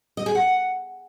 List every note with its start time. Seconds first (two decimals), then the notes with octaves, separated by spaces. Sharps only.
0.17 D#5
0.26 G#4
0.35 F#5